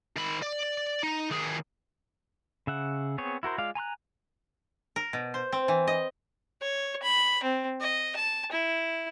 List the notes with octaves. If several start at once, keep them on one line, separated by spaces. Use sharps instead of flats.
D#3 B5
D5
D#4
D#2 G#4
C#3 E5 F#5
B3 C4 G#4 C#5
E4 F#4 A#4 C5
G#3 F4 D5 F5
G#5 A#5 C6 F#6
A#4
B2
C5
C4
E3
D#5
C#5
B5
C4
D#5
A5
E4